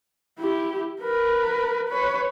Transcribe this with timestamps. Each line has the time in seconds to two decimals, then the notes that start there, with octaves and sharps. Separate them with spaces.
0.39 E4 G4
1.01 A#4 B4
1.89 B4 C#5